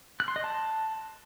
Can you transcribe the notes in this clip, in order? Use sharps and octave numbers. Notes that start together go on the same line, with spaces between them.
F#6
C6
D#5
A5